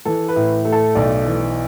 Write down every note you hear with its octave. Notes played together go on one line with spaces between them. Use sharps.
E3 A4
B4
A2
A3
A4
B1 D5
E3